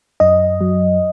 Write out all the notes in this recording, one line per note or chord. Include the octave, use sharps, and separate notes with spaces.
F#2 D#5
F#3